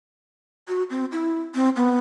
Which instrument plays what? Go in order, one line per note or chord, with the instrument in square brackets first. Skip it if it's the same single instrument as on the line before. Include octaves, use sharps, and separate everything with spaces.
[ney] F#4
C4
E4
C4
B3